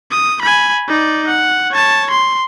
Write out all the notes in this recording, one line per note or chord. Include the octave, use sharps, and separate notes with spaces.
D#6
G#5 B5
D#4 D5
F#5
C#5 A5
C6